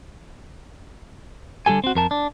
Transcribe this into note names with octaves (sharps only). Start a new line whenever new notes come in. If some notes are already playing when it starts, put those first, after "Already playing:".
D3 G3 G4 A4 G#5
C4 F#4
F2 A#4 A5
D4